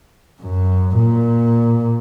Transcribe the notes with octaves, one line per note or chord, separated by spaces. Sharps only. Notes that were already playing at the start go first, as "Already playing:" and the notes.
F#2
A#2